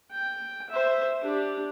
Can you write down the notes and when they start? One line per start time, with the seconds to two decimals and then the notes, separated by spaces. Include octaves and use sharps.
0.12 G5
0.70 C5 E5
1.23 D4 G4